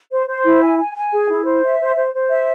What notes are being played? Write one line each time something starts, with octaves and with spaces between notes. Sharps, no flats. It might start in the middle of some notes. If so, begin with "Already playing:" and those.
C5
C5
E4
G#5
G#5
G#5
G#4
E4
C5
E5
C5
C5
C5
E5